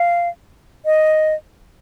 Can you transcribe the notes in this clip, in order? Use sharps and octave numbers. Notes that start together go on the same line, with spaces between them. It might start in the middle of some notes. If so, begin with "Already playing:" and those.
Already playing: F5
D#5